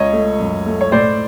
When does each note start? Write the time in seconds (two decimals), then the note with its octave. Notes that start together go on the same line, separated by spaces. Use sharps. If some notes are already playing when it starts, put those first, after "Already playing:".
Already playing: C#2 C#5 D#5
0.13 A3
0.40 F#2
0.66 A3
0.81 C#5
0.92 A2 C5 D5